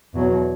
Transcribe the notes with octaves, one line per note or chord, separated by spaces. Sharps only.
E2 B2 F#3